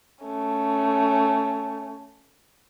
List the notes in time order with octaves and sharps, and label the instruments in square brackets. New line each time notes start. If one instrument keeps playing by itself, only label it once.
[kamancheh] A3 C#4